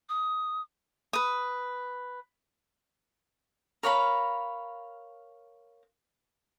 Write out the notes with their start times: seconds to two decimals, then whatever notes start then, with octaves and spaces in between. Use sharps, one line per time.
0.09 D#6
1.13 B4 D#6
3.83 A#4 C#5 F5 B5